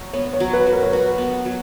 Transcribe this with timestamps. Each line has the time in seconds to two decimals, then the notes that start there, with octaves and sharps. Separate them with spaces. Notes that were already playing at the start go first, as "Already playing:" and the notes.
Already playing: F#3 F#4
0.13 B3 C#5
0.33 C#5
0.40 F#3
0.53 B4
0.67 F#3
0.73 A#4
0.83 C#5
0.92 F#4 B4
1.18 B3
1.45 F#3